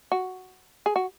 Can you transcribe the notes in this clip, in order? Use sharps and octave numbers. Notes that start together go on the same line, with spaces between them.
F#4
G#4
F#4